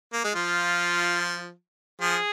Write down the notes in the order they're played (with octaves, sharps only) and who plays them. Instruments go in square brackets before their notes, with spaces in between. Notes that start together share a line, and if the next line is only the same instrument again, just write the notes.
[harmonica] A#3
G#3
[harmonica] F3 [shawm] F4
[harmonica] F3 [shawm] G#4